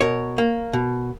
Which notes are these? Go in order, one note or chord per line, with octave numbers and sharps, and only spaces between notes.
B2 A#4 C#5
A#3
B2